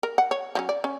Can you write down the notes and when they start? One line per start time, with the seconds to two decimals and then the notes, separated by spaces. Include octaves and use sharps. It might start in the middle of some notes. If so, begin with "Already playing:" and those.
0.03 A#4
0.18 F#5
0.31 C#5
0.55 F3 F#3 C#4
0.69 D5
0.84 C#4